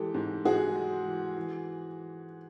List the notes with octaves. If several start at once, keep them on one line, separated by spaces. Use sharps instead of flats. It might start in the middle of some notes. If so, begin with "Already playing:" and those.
Already playing: E3 G#3 G4 A4
G#2
G#2 F#4 G#4
G#3
E3
E3